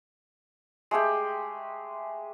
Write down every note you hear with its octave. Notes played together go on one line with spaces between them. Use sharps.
G#3 A3 G4 G5